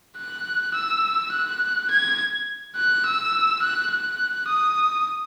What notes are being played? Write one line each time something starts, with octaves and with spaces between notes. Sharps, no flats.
F#6
E6
F#6
G#6
F#6
E6
F#6
F#6
D#6